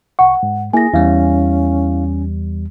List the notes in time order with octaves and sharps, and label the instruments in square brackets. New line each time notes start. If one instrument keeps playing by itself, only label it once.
[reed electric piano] C2 C#6 [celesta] F#5
[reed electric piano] G#2
[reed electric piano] A#3 E4 [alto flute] G#4 [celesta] G#5 A#6
[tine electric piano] E2 G3 [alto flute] C#4 [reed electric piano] E4 F5